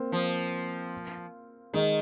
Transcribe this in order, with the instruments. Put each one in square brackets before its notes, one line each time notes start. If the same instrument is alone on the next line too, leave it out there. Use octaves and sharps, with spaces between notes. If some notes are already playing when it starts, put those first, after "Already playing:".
Already playing: [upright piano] A#3 C4
[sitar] F3
[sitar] D#3 [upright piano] G#3